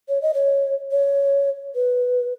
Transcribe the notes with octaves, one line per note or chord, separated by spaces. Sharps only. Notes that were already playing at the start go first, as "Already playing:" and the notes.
C#5
D#5
C#5
C#5
B4